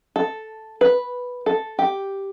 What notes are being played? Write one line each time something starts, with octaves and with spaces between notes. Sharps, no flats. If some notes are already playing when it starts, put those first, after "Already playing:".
A4
B4
A4
G4